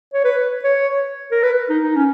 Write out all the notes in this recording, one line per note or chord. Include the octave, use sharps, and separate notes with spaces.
C#5
B4
C#5
A#4
B4
D#4
D#4
C#4